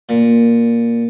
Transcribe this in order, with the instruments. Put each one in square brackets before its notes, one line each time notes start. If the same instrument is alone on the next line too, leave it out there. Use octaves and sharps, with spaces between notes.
[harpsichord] A#2